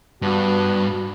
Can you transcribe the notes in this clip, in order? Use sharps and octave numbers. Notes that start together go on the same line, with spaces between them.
G2 B3 D4 F#4 B4